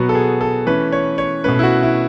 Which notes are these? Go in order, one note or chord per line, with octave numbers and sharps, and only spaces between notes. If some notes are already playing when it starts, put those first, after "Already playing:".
Already playing: B2 F#3 B3 F#4
A4
G#4
A4
E3 A3 C#4 B4
C#5
C#5
B2 A3 C#4 B4
E4
F#4
E4